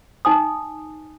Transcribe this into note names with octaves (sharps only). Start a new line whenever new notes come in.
D#4 G#5 D#6